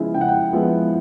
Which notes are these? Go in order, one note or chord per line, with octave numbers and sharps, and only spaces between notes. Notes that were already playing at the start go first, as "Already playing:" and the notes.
Already playing: C#3 F3 G#3 B3 E4
C#3 G5
F#5
G5
F3 G#3 B3 E4